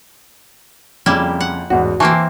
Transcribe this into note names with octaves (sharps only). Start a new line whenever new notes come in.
F2 C#3 G3 A#3 E4
F#5
A1 E2 G#2 F#4
E3 A#3 C4 G#5 A5 C#6